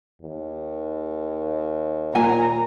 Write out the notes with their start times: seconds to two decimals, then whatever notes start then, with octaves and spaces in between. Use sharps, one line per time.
0.22 D#2
2.15 A#2 G#5 A#5